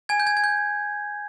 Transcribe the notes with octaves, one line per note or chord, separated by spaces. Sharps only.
G#5 G#6
G6
G#5 G#6
G#6
G6